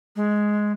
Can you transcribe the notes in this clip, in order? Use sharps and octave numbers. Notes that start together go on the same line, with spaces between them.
G#3